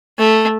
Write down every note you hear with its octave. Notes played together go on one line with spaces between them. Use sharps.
A3